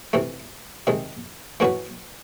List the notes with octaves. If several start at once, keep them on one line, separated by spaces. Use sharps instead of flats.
C3 E3 A3
C3 D#3 G#3
E3 A3 C#4 F#4 B4